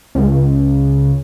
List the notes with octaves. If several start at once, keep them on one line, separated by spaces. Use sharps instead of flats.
C#2